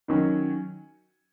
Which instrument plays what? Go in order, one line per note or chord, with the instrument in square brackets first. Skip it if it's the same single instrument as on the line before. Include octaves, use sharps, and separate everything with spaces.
[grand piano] D#3 F#3 C#4